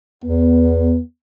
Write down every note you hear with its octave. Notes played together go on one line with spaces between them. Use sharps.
E2 B3